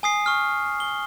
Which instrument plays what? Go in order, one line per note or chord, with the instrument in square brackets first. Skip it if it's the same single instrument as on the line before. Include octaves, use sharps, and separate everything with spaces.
[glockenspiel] G#5 D#6 C7
C#6 F6
G7